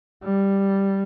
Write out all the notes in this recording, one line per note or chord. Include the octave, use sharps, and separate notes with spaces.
G3